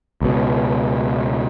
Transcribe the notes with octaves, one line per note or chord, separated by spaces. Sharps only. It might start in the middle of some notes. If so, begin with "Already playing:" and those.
C#2 B2